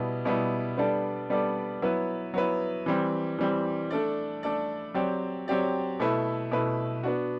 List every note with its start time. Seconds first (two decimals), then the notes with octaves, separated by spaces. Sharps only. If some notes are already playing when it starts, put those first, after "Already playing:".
Already playing: B2 G3 B3 E4
0.25 B2 G3 B3 E4
0.77 G3 B3 D4 A4 D5
1.30 G3 B3 D4 A4 D5
1.82 F#3 B3 E4 B4
2.34 F#3 B3 E4 B4
2.86 E3 G3 C4
3.39 E3 G3 C4
3.91 A3 D4 A4 D5
4.43 A3 D4 A4 D5
4.94 F#3 C4 G4 D5
5.48 F#3 C4 G4 D5
6.00 B2 A3 E4 B4
6.51 B2 A3 E4 B4
7.03 B3 D4 F#4